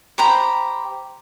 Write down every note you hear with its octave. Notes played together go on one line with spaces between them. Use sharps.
G4 C5 A#5 B5